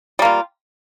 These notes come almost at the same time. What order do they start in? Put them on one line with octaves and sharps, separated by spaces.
G3 A#3 F4